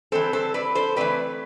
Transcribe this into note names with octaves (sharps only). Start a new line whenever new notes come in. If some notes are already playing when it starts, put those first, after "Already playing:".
E3 G3 C4 A4 C5
A4 C5
B4 D5
A4 C5
E3 A3 C4 B4 D5